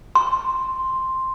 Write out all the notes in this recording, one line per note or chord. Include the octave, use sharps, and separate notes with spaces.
C6